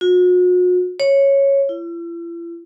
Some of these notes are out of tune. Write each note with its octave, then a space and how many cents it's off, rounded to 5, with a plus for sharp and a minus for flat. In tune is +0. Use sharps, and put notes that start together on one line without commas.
F#4 -40
C#5 -5
E4 +45